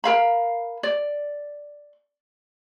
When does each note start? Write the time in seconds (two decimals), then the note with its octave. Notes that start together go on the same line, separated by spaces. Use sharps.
0.04 A#4 F5 B5
0.83 D5